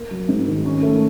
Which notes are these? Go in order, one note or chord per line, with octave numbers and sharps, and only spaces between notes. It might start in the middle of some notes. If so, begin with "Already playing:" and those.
Already playing: A#3
F#3
G#2
D#3
C#4
A3